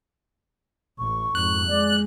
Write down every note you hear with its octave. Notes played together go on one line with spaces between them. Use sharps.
A1 C#6
F2 G#2 F#6
G#3 D5